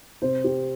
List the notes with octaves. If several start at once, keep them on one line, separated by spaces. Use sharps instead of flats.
C3 C5
G4